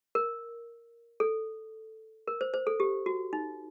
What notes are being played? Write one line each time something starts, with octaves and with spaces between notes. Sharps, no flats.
A#4
A4
A#4
C5
C5
A4
G4
F#4
D#4